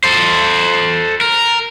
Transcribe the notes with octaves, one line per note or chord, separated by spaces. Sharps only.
A4 C5
A#4